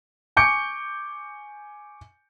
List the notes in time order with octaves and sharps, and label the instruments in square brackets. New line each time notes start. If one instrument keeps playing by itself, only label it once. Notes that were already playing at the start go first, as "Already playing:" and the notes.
[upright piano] G#5 C#6 D6 G6 C#7 D7